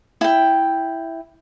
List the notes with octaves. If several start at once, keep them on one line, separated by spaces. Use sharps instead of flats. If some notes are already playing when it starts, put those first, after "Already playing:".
E4 G5